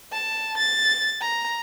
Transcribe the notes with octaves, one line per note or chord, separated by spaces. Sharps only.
A5
A6
A#5